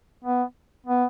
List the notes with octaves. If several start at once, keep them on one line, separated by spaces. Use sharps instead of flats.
B3
B3